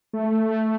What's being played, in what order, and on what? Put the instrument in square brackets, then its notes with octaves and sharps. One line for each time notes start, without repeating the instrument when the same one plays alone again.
[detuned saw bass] A3